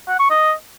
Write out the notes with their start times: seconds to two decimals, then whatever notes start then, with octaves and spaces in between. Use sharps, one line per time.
0.08 F#5
0.19 C#6
0.30 D#5